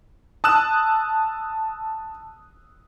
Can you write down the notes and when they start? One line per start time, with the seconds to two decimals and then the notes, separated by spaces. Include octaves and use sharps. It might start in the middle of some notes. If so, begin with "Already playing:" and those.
0.44 A5 D#6 E6 F#6 E7